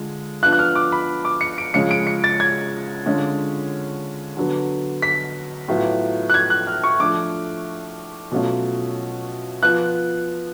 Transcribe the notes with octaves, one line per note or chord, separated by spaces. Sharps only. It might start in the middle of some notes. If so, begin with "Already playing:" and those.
Already playing: D3 G#3 F4
F3 B3 D4 F4 F#6
F#6
F6
D6
B5
D6
C#7
D7
C#3 F3 G#3 C#4 F4 C#7
D7
C#7
A6
G#6
D3 G#3 C#4 F4
D3 F#3 B3
B6
A2 F#3 B3 F4
F#6
G#6
F#6
F6
C#6
F3 A3 D4 D6
B2 F#3 A3 C#4 F4
F3 B3 F4 F#6